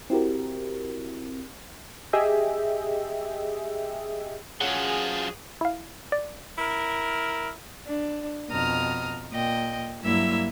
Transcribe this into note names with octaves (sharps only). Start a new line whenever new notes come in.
C4 E4 F#4 G4 A#4
G4 G#4 D#5 E5 G5
F#3 C#4 F4 G#4 F#5
E4 F5
D5
E4 A#4
D4
F2 B2 A#5 D#6 F6
A#2 D#5 G5
G2 F#3 A#3 E4 E5 E6